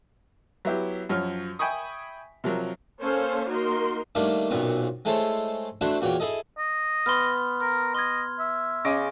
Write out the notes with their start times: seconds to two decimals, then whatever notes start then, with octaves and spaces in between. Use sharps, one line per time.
0.65 F#3 B3 E4 G4
1.09 F#2 F3 C#5 F6
1.59 E5 G5 G#5 B5 C#6 D#6
2.44 C3 F3 F#3 A#4
3.01 A#3 C#4 A4 C5 C#5 F5
3.49 A#3 D#4 F#4 A#4 C6
4.15 D#3 G3 A3 A#3 D4
4.50 B1 F#2 A#2 B3 C4 C#6
5.05 G#3 A3 E4 A4 C5 C#5
5.81 A3 D4 E4 F#4 C5 E5
6.01 E2 A#2 F#4 C#5 G5 C#6
6.20 E4 G#4 A4 D#5
6.58 D#5
7.06 B3 C6 F6
7.60 A#4 F6
7.95 D#5 C6 G#6
8.39 E5
8.85 C#3 D#5 D6